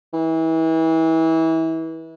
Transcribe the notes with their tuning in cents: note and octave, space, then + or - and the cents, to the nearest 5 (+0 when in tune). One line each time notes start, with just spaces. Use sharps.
E3 -30